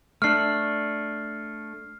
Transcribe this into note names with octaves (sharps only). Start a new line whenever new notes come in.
A3 D4 F6 C7